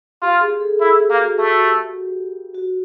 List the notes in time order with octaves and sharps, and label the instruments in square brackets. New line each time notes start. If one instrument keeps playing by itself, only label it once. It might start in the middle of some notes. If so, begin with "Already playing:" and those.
[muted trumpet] F4 [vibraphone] G4
[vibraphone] G#4
A4
[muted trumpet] E4
[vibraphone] G4
[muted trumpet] A#3
[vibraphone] F#4
[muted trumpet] A3 [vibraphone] G4
[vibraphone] F#4
G4
F#4